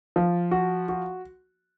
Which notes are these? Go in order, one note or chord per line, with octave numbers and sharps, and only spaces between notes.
F3
F#4
F#4